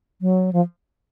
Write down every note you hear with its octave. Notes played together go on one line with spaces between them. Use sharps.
F#3
F3